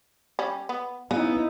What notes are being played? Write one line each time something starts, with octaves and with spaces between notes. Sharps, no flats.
G3 C#4
B3
C#3 B3 D#4 E4